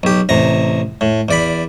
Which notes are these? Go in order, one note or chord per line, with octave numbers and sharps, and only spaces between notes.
B1 G4
A1 C3 A#5
A2
E2 D5 B5